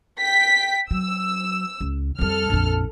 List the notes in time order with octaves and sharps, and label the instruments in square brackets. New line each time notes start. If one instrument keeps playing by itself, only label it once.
[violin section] G5 B6
[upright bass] F#3 [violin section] E6
[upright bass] C#2
[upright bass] F2 G3 [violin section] A4 F6
[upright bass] A#1 F2